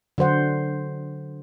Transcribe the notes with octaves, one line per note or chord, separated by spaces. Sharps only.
D3 F#3 C5 F#5